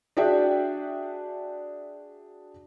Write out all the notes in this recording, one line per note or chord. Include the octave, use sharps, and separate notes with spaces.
D4 F#4 G#4 D5 E5 G5